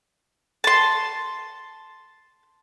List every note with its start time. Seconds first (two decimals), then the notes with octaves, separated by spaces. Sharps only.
0.64 A5 C6